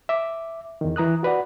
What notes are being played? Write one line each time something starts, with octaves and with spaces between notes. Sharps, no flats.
E5 D6
E2 D#3
E3 A#5 D#6 F#6
F#4 B4 D5 F#5